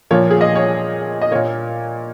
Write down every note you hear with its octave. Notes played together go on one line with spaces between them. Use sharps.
A#2 F3 A#3 C#5
G#4
D#5
C#5
D#5
A#2 A#3 C#5